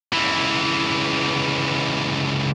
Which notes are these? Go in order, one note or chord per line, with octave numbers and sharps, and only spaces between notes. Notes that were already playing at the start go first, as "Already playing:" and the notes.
C#2 E3